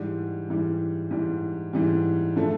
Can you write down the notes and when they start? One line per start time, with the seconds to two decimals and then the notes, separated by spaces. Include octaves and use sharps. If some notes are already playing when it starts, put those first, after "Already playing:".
Already playing: G#2 E3 G3
0.49 G#2 E3 G3
1.11 G#2 E3 G3
1.73 G#2 E3 G3
2.36 D3 F3 A3